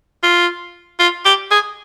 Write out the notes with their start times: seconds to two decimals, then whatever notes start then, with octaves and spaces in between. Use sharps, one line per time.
0.23 F4
1.00 F4
1.25 G4
1.51 G#4